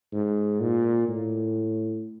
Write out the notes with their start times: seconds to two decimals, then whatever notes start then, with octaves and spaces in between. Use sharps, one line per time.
0.12 G#2
0.60 A#2
1.08 A2